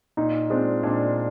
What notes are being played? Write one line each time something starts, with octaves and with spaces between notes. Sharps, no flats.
A#2 D#4
G#3 C4 D4 F4
A#2 D4